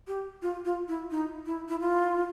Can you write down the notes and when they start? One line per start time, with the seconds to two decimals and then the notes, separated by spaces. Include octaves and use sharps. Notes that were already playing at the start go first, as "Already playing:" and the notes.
0.08 G4
0.42 F4
0.65 F4
0.88 E4
1.11 D#4
1.46 E4
1.69 E4
1.80 F4